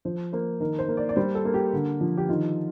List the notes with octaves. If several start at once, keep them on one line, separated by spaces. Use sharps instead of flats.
F3 C5
A#3 C5
D#3 A#4
C5
A#3
D5
D5
G3 C5
A4
A#3
G4
D3
F3
G4
D#3 F4